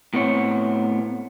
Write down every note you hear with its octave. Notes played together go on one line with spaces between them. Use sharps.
A2 B3 C4 C#5